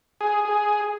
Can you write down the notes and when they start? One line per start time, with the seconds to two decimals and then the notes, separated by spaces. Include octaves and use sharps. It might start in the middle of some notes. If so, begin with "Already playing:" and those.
0.21 G#4
0.45 G#4